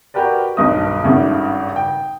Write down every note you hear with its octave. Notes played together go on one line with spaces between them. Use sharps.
F#4 G4 A#4 B4 D5
D#1 B1 G2 D#5 D#6
G#1 G2 C#3 A3
G5